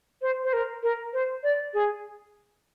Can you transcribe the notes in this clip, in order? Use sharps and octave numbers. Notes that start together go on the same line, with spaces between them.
C5
C5
A#4
A#4
C5
D5
G#4